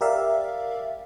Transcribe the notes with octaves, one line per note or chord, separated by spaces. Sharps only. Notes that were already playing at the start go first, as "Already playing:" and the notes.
G4 A#4 D5 E5 F5